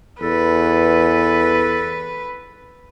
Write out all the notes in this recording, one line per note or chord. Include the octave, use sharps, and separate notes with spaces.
E2 A4 B4